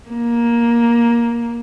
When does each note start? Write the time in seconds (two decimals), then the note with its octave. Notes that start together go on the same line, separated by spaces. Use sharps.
0.10 A#3